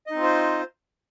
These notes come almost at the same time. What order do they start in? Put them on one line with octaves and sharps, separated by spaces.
D#5 D#4 C4 F4 C5